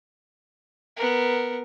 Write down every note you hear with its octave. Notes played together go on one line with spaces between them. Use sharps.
B3 A#4